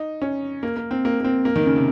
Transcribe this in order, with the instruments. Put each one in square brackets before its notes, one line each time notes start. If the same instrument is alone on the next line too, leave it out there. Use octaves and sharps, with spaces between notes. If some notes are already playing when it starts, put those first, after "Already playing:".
Already playing: [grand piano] D#4
C#4
A#3
A#3
C4
A#3
A#3
C4
A#3
D#3
C#3
C3